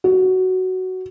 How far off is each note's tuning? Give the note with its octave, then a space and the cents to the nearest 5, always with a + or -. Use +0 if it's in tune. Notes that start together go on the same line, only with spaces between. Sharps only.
F#4 +10